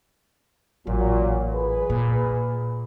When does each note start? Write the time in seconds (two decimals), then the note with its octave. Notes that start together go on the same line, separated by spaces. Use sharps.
0.87 A1 A#2 F#3
1.53 G#4 B4
1.90 A#2